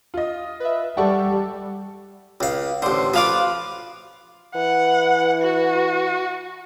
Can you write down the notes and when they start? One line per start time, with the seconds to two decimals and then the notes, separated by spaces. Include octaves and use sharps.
0.14 F4 D#5
0.60 B4 E5
0.97 G3 G4 A4 D5 F#5 C#6
2.41 C#2 F5
2.82 A1 D3 C5 C6
3.14 F3 F4 B4 F5 D6
4.55 E3 F#5
5.42 F#4